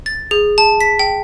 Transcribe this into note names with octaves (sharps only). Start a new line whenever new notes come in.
A6
G#4
A5
B6
G5